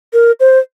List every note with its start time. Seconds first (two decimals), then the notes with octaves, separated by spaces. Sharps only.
0.13 A#4
0.40 C5